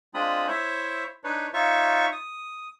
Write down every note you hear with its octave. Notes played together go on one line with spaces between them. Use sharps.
G#3 C4 D4 F4 B5 D#6
E4 C5 C#5 E5
D4 D#4 B4 C#5
D#4 F4 C#5 E5 C#6
D#6